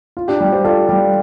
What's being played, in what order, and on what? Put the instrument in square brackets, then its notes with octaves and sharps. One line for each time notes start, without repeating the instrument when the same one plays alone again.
[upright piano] F4
[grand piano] D4 G4
[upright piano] G3
[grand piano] G4 C5
[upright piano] F4 [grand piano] A4 D5
[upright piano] G3